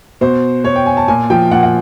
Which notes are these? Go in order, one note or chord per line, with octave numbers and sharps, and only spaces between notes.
B2 C5
B2 C#5
G5
G#5
A5
A#2 G#5
F3 G5
A#2 F#5
F#5